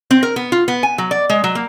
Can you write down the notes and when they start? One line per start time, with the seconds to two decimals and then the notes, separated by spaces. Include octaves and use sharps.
0.11 C4
0.23 A#4
0.36 B3
0.52 F4
0.68 B3
0.83 G#5
0.98 F#3
1.11 D5
1.30 G#3
1.44 F#3
1.55 A#3